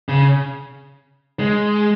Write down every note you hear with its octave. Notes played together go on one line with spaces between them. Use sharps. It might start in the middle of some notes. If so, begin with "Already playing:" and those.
C#3
G#3